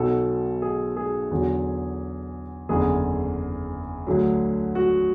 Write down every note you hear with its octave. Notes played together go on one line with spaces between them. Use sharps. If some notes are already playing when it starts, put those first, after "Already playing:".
Already playing: B1 B2 F#3 A4
G#4
G#4
E2 D3 F#3
F#1 E2 D3 G#4
D2 D3 F#3
F#4